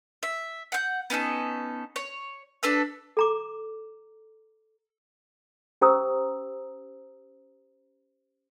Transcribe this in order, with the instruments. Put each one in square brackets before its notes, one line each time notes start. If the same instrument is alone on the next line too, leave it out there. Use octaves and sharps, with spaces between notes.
[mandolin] E5
F#5 G6
B3 C#4 D#4 A4
C#5
D4 A4 B4 E6
[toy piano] A4 A#5 D6
C#4 G4 C5 A#5 D#6 E6